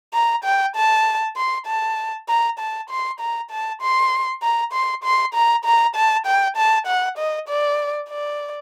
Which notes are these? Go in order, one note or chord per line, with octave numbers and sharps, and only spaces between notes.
A#5
G5
A5
C6
A5
A#5
A5
C6
A#5
A5
C6
A#5
C6
C6
A#5
A#5
A5
G5
A5
F#5
D#5
D5
D5